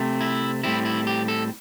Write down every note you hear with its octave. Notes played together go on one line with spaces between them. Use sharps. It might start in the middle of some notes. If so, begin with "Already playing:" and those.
Already playing: C3 A3 C4
E4
A2 G3 C4 E4
E4
G4
A4